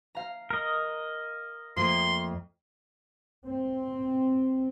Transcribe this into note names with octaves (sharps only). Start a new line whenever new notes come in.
F5 A#5
A#4 D#5
F2 A3 A#3 C6
C4